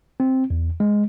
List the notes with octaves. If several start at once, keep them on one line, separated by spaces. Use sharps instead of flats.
C4
E2
G#3